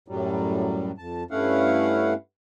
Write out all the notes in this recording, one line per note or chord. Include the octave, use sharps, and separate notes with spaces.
F#2 A2 F#3 G3
F2 A5
G2 A3 C#4 E4 F5 F#5